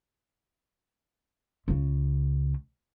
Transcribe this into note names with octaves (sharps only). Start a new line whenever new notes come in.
C#2 C#3